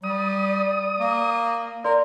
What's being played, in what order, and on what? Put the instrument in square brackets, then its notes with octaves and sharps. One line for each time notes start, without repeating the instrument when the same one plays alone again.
[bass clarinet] G3 [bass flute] D5 [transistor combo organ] D#6
[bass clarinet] A#3
[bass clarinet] A#4 [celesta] D5 C6